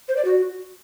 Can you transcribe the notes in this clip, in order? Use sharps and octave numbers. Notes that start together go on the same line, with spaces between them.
C5
D5
F#4